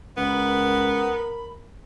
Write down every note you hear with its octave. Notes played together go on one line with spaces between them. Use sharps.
C#2 B3 A#4 B5